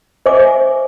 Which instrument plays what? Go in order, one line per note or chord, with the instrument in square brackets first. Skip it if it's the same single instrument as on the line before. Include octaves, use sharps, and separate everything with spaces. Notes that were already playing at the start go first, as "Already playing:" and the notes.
[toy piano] C5 D#5 E5 G#5 D6